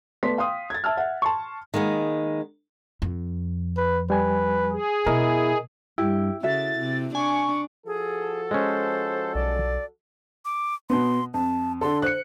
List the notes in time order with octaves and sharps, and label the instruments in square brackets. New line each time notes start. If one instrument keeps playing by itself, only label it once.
[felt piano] A3 B3 D5 C6 B6
F5 G5 C6 D#6
G#6 A6
E5 A5 E6 F6
E5 F#5
A5 C6 C#6
[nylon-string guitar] D#3 G#3 A#3 B3
[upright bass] F2
[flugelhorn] B4
[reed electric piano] G3 G#5 [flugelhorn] B4
[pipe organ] G#4
[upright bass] B2 [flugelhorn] E4 [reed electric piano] A#4 D#5
[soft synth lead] G2 [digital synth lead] E4 [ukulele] G4
[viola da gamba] C#3 [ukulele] F#4 A4 E5 [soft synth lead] A6
[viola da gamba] C3
[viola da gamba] D4 [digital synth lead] G#5 [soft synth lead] C#6
[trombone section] F3 F#4 A4 [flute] G#4
[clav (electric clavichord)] G#3 C#4 [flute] C5
[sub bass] B1 [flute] D5
[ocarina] D6
[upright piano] B2 B3 [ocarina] C6
[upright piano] F2 [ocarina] A5
[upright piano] D3 A4 [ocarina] C6
[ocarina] C5 [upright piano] F#6 C#7